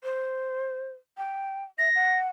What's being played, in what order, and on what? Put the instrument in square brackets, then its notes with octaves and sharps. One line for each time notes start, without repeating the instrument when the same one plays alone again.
[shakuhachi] C5
G5
[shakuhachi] E5 [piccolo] A#6
[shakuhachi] F#5